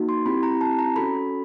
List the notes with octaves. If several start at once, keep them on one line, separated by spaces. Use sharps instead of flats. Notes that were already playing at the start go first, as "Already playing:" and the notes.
Already playing: A#3 D#4 F#4
C6
C4 E4 G4 B5
A#5
A5
A#5
C#4 F#4 A4 B5